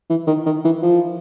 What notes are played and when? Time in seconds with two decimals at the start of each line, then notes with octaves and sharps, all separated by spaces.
0.10 E3
0.27 D#3
0.46 D#3
0.65 E3
0.83 F3